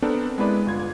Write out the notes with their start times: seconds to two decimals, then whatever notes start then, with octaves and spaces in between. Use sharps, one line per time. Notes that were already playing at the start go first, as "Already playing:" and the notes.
0.02 B3 C4 D4 A4 A#4
0.38 G#3 B3 E4 B4 D5
0.67 G1 F4 G#6